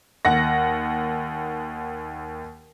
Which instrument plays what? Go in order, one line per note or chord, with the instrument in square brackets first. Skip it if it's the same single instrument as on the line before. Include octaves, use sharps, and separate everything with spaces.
[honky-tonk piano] D#2 F#5 A#6